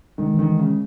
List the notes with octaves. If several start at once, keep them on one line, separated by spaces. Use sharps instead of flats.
D#3 G#3
D#3 E3
G#3
C#3